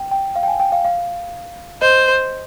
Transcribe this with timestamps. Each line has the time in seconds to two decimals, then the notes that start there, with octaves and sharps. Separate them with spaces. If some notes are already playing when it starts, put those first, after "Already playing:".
Already playing: G5
0.11 G5
0.36 F5
0.43 G5
0.48 G#5
0.60 G5
0.72 F5
0.85 F5
1.81 C5 D#5